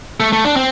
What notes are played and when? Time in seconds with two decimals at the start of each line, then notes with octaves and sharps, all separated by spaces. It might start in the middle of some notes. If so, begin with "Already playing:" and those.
0.20 A3
0.33 A3
0.45 D4
0.56 C4